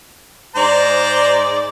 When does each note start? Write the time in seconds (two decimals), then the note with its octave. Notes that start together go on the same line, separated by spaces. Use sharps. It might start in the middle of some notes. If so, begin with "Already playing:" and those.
0.56 G#2 C5 D5 A#5